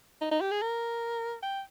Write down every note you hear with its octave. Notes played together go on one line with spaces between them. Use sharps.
D#4
D#4
G4
G#4
A#4
G5